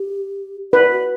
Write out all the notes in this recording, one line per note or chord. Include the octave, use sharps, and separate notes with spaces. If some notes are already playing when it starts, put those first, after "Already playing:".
Already playing: G4
B4 D5
F#4